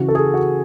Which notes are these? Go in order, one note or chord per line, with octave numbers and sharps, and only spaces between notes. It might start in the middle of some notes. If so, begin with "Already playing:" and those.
Already playing: C#3 E3 F#4
A4
G#4
F#4